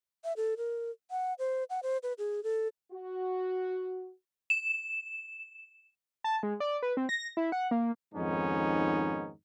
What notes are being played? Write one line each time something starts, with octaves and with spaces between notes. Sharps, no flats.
E5
A4
A#4
F#5
C5
F#5
C5
B4
G#4
A4
F#4
E7
A5
G#3
D5
B4
C4
A#6
E4
F#5
A#3
F2 G#2 D#3 B3 C#4 D#4